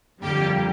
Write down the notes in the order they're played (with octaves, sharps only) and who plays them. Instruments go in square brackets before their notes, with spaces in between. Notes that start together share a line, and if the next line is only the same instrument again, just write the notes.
[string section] F2 D3 G3 A#3 G4